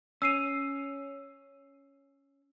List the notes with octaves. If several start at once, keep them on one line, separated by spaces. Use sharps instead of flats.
C#4 E6 C7 D#7